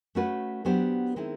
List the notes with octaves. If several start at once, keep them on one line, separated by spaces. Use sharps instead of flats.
A3 C#4 F#4 B4
F#3 B3 D4 G4 C5
D#3 G#3 C4 E4